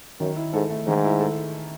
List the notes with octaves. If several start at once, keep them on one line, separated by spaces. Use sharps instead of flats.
F#2 D#3
E4
G#2 A4
A3
G#2 D#3
E4
A4